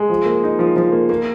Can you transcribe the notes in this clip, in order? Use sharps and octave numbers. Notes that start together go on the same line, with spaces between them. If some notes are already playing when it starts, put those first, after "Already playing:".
Already playing: G#3
F3
A#3
D#4
F3
F3
A#3
A#3